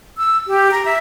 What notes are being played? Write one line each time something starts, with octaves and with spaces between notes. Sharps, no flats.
E6
G4
A#5
E5